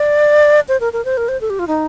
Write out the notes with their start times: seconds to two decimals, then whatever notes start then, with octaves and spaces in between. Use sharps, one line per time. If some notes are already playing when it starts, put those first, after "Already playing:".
Already playing: D5
0.68 C5
0.80 A#4
0.93 A#4
1.05 C5
1.17 A#4
1.29 C5
1.41 A4
1.50 G4
1.59 F4
1.68 D#4